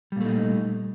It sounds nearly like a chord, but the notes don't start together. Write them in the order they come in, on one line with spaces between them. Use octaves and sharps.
G3 A#2 A3 D#4